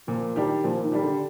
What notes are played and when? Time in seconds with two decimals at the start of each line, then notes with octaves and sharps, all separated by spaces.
0.07 A#2 F3
0.36 D#3 G3 D4 G4
0.64 A#2 F3
0.83 D#3
0.92 G3 D4 G4
1.02 D3